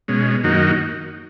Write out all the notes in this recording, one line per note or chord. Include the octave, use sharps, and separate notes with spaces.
B2 G#3 C#4
F#2 D#3 A#3 D#4 F#4